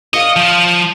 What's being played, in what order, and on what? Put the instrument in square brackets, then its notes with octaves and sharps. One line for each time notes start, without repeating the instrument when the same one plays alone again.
[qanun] D5 F5 C#6 [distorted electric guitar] D#5
[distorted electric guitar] F3